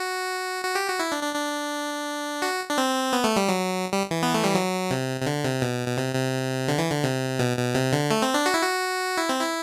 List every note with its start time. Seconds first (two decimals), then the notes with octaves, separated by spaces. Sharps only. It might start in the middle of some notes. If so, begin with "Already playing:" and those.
Already playing: F#4
0.64 F#4
0.75 G4
0.88 F#4
0.99 E4
1.12 D4
1.23 D4
1.35 D4
2.42 F#4
2.70 D4
2.78 C4
3.13 B3
3.24 A3
3.36 G3
3.49 F#3
3.93 G3
4.11 E3
4.23 B3
4.34 A3
4.44 G3
4.55 F#3
4.90 C3
5.21 C3
5.27 D3
5.44 C3
5.62 B2
5.88 B2
5.98 C3
6.15 C3
6.68 D3
6.79 E3
6.90 D3
7.04 C3
7.39 B2
7.57 B2
7.75 C3
7.93 D3
8.11 A3
8.22 C4
8.34 D4
8.46 F#4
8.54 E4
8.62 F#4
9.17 E4
9.29 C4
9.41 E4